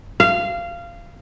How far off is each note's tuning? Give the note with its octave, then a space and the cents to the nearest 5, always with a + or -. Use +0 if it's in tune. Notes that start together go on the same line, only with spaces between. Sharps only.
F5 -20